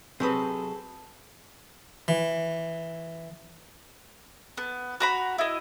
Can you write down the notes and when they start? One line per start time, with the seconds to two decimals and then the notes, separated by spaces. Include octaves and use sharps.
0.20 C3 F#3 C4 G#4 A4 B4 D#6
2.08 E3
4.57 B3
5.00 F#4 A#5 B5
5.38 E4 D#5